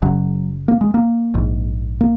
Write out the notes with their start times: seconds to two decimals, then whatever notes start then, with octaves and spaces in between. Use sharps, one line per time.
0.02 F#1 F#2 C#3 F#3
0.68 A#3
0.81 G#3
0.94 A#3
1.34 A#1 G#2
2.01 A#3